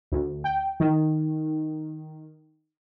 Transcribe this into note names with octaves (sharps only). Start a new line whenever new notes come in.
D2
G5
D#3